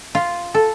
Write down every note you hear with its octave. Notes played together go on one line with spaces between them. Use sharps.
F4
A4